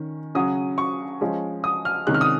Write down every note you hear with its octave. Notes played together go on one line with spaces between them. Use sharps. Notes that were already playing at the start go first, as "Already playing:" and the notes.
Already playing: D#3 C#4
C#3 F#3 C#4 D#6
C#6
F3 G#3 C#4
D#6
F6
C3 D#3 G#3 C#4 F#6
F6
D#6